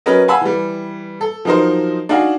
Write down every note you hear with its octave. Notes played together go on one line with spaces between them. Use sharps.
F#3 B3 C#4 A#4 B4 D#5
F5 F#5 G#5 A5 B5 E6
E3 G3
A4
F3 F#3 D#4 A#4 C5
D4 D#4 F#4 F5 G#5